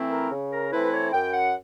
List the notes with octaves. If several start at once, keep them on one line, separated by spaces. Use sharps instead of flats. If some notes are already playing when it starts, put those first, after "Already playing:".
Already playing: E3 A3 C4 E4
A#4
C#3
A#4
E3 A3 C4 E4 B4
C#5
F#2 G5
F#5